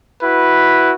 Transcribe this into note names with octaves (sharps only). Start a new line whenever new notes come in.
E4 F#4 B4